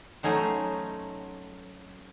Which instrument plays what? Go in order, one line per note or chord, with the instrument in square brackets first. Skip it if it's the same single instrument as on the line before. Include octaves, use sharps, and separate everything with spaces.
[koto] F#3 A3 C#4 D#4 C5